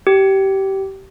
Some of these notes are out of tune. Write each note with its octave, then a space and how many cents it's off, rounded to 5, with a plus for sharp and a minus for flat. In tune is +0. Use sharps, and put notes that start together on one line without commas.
G4 -20